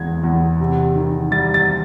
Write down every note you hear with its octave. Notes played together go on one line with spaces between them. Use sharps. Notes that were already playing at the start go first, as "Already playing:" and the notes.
Already playing: E2 G#3 G#6
E2
C3
D#3
G3 A6
A6